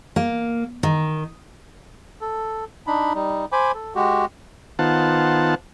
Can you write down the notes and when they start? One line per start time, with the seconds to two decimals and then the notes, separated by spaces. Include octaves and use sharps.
0.16 A#3
0.83 D#3
2.21 A4
2.87 D4 D#4 B5
3.14 G3 D#4
3.52 C5 G#5 B5 D6
3.75 A4
3.95 G#3 F#4 G4
4.79 D#3 B3 F4 C5 F#5 A5